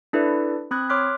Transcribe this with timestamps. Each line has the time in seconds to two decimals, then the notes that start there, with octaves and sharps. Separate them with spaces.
0.13 D4 E4 A4 B4 D5 E5
0.71 C4 B5 D#6 F#6 G#6
0.89 C#5 C6 D6 F6 F#6 B6